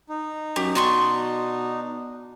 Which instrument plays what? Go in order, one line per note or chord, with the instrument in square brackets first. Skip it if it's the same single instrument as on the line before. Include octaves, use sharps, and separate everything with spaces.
[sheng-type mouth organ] D#4
[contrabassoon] F#2 [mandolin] G4
[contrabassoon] B2 [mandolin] D4 C6 C#6